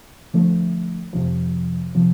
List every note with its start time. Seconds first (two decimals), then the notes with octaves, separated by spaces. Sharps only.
0.34 D3 F3 A3
1.13 F2 C3 F3
1.95 C3 F3